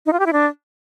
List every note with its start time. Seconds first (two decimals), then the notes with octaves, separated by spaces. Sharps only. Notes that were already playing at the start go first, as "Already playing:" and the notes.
0.06 D#4
0.13 F4
0.19 G4
0.26 E4
0.33 D4